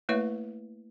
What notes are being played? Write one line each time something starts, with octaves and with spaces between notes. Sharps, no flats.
A3 A#3 E4 B4 C#5 E5